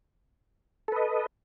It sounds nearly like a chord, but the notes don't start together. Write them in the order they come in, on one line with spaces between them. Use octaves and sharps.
A4 B4 D#5